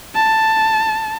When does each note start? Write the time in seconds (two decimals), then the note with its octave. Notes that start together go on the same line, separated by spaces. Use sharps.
0.15 A5